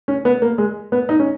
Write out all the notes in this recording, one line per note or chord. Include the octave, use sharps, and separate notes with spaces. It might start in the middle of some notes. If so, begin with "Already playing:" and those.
C#4
B3
A#3
G#3
B3
D#4
C#4